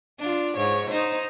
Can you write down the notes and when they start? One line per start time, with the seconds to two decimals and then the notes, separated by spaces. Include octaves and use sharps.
0.19 D4 F4
0.57 G#2 C#5
0.90 D#4 C5